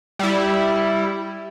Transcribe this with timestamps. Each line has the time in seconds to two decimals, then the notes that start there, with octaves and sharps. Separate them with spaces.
0.19 G3 E4